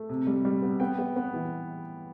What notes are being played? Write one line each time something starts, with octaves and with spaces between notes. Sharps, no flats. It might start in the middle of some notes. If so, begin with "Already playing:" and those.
Already playing: A3
C3
G3
G3
B3
B3 G5
B3
B3
E3